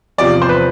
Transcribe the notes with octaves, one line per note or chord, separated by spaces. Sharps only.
E2 C3 F3 D5
C5
B4